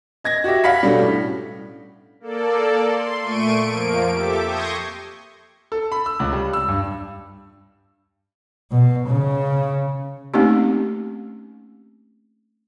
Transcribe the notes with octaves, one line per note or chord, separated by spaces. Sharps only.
D#5 G#6 A#6
F#4 G4 E5
F5 F#5 B5 B6
B2 G3 C#4 D4 A4
A2
A#3 A4 D5
C6
A#2 A3 C#6 D7 D#7
F2 F3 A#3 D7
G4 A4 E5 D6
C6 C#6 D#6 G6 G#6 A#6
A4
B5
E6
C#2
G3
E6
G2
B2
C#3
A3 A#3 C4 C#4 D#4 G4